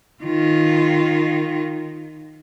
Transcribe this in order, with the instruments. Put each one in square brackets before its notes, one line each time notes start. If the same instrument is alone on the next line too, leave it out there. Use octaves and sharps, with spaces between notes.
[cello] D#3 F4